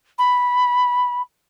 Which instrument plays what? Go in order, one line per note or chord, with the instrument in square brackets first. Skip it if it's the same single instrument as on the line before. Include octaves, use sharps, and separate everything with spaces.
[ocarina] B5